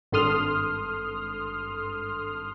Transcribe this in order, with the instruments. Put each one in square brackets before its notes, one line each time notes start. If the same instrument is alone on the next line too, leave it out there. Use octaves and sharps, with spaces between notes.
[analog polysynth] G#1 G2 A4 C6 D#6 F6